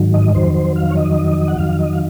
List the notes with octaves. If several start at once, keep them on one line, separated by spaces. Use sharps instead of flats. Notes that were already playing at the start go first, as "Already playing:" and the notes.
Already playing: G#2 D#3 F#3
D#5
F2 D#3 F#3 C5
C5
F5
C#5
D#5
F#5
F2 D#3 F#3 F5
D#5
F5